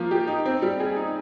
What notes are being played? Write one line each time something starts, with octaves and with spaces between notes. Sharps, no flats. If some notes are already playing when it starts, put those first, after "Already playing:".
Already playing: F3 A#3
G4
D#4
C4
G3
G#4
D#4